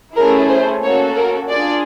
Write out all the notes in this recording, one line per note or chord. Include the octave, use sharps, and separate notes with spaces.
A3 C#4 E4 G#4 A#4
C5
A#3 C#4 F#4 A4 C#5
A#4
D4 F4 G#4 D5